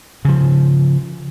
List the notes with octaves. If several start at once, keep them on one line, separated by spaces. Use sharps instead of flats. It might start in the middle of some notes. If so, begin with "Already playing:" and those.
C#3 F3